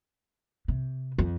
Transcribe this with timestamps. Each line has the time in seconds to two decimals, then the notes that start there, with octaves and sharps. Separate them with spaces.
0.68 C3
1.18 F2